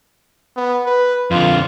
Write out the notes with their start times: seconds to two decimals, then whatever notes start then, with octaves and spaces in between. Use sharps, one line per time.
0.56 B3
0.86 B4
1.31 F2 D3 F4